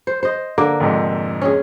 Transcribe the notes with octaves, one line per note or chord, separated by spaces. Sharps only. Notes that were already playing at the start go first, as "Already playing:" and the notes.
C5
C5 D#5
D3 A#3 A#4 D6
F1 F2 G#2
C#4 G#4